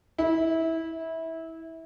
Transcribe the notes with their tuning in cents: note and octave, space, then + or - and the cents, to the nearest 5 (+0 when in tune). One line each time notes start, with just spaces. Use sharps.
E4 -20